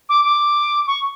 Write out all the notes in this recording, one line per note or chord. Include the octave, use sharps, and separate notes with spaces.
D6
D6
C#6